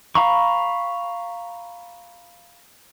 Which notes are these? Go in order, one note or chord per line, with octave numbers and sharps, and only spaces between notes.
F5 A#5 B5 C#6